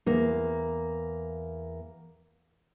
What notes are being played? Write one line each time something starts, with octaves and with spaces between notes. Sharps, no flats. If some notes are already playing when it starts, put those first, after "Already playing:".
E2 A#3